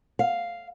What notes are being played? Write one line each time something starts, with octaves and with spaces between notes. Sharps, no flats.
F5